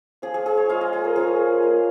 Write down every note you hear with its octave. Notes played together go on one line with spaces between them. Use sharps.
F3 C#4 F4 G#4
G#4
G#4
C#5
G#3 F4 F5
D#5
G#4
A#4
F3 C#4 F4 G#4
A#3 F4